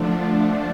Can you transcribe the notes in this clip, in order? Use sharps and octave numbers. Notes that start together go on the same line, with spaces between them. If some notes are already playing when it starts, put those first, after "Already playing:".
Already playing: D3 F3 A3 D4